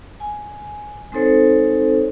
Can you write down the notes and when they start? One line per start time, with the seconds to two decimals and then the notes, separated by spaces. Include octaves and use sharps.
0.20 G#5
1.12 G#3 C4 D#4 A4 C5 C#5